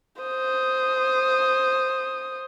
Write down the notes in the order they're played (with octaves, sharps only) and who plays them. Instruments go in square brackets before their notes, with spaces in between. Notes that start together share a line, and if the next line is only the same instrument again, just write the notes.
[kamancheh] C5 D#6